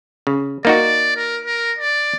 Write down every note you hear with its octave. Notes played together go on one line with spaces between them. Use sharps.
C#3
A#3 D#4 F#4 D5
A#4
A#4
D5